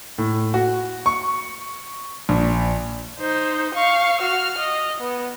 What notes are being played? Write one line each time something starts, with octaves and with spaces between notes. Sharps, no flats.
A2
F#4
C#6
A#1
D#4 C5
F5 C#6
F#4 F6
D#5
B3